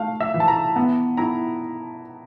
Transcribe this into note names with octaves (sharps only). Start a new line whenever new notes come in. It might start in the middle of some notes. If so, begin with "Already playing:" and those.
Already playing: A3 F5
E5
E3
A5
A#5
B3
E4 A#5